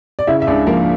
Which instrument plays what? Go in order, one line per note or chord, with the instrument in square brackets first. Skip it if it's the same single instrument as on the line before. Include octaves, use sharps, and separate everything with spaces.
[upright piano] D5
C#3 E4 E5
E5
C#2 D4 D5
F3 A#3 A#4